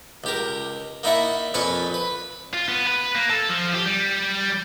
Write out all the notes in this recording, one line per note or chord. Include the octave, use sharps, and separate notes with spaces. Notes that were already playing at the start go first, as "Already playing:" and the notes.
C#2 G4 A#4
A#3 D#4 E4 D5 E5 F#5
F2 A#2 B4 G#5 C#6 D6
B4
F4
B3
B4
A#3
A4
F3
G4
G3